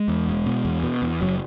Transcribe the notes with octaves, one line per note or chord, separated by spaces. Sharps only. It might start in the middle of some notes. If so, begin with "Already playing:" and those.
Already playing: G#3
E2
E1
B2
E2
B2
E2
F#1 F#3